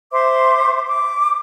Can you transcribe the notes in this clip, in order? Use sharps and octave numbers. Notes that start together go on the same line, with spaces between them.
C5 E5 C6 D6
D6